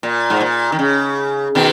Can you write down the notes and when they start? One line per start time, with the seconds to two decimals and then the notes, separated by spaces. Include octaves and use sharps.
0.03 A#2
0.30 G#2
0.41 A#2
0.72 D#3
0.79 C#3
1.55 B2 D#3